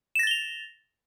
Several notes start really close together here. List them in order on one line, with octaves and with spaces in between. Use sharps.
E7 A#6 A6 G7 F7